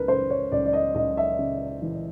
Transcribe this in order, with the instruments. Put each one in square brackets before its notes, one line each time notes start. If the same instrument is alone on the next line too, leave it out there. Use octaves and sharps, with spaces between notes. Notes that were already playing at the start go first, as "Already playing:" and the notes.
Already playing: [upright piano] C#2 A#4 B4
C#3 C5
C#5
C#2 D5
D5
D#5
C#2 D#5
E5
C#3
E3